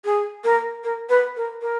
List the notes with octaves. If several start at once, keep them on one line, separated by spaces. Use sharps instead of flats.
G#4
A#4
A#4
B4
A#4
A#4